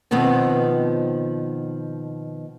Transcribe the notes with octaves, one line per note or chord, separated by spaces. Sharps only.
B2 D#3 F3 B3 C4